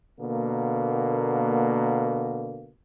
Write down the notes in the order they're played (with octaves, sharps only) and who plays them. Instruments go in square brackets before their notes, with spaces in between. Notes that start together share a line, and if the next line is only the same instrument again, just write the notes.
[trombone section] B2 D3 A#3